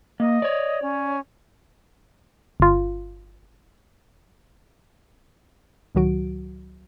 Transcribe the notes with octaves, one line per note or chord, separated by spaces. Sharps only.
A#3 D#5
C#5 D5
C#4
G1 F4
C#2 A2 D#3 F#3 F#4 D7